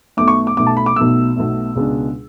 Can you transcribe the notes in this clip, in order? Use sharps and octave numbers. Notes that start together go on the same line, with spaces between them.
B1 B2 A3 D6
C#6
D6
B1 B2 A3 D6
A5
B5
D6
B1 B2 A3 E6
B1 B2 A3
C#2 B2 G#3 D4